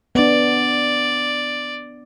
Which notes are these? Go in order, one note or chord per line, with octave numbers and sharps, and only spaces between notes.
B3 D4 D5